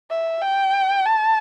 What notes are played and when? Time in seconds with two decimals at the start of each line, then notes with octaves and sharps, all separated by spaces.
0.10 E5
0.41 G5
1.05 A5